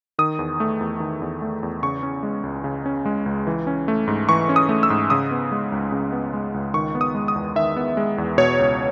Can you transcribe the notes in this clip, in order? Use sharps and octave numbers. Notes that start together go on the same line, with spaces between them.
D#3 D#6
E2
A3
E2
D#3
E2
A3
E2
C#3 C#6
C#4
G#3
C#2
C#3
C#4
G#3
C#2
E3
C#4
A3
G#2
E3 C#6
C#4
D#6
A3
E6
G#2
C#3 D#6
B3
G#3
C#2
C#3
B3
G#3
C#2
D#3 C#6
B3
D#6
G#3
D#6
E2
D#3 E5
B3
G#3
E2
B2 C#5
C#2